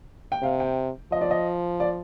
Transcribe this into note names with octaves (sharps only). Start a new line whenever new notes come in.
G5
C3 F5
G5
F3 D#5
D5
D#5
D5